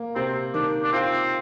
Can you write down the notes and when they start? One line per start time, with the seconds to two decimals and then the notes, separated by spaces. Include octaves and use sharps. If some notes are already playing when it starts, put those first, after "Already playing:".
Already playing: A#3
0.15 C3 C4
0.54 D#3 D4
0.83 D4
0.93 C4 F4